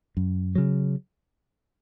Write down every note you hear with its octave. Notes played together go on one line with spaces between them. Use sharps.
F#2
C#3 F#3